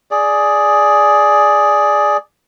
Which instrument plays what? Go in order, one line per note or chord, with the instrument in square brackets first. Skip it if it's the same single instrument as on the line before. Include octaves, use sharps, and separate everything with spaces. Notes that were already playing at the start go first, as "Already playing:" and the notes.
[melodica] G#4 D5